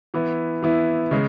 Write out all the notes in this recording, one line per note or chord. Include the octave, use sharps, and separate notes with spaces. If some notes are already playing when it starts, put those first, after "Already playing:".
E3 B3 E4
E3 B3 E4
C#3 G#3